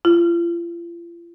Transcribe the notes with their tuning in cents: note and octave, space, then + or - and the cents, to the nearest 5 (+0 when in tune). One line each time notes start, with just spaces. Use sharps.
F4 -40